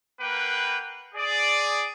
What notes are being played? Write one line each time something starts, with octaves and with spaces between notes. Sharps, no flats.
A#3 B4 F#5 G5
G#4 D5